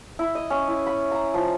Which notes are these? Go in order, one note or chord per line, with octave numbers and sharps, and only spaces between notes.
E4
D#5
C#4
E4
B5
A#5
F3